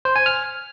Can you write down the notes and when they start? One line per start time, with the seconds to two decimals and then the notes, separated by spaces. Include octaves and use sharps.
0.05 C5
0.16 G#5
0.26 F6